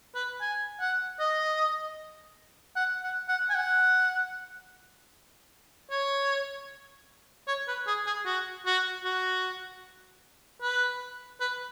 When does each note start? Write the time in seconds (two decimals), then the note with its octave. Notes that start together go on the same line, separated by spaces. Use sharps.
0.15 B4
0.41 G#5
0.81 F#5
1.20 D#5
2.76 F#5
3.04 F#5
3.29 F#5
3.50 G#5
3.55 F#5
5.91 C#5
7.48 C#5
7.68 B4
7.87 G#4
8.07 G#4
8.26 F#4
8.66 F#4
9.05 F#4
10.62 B4
11.41 B4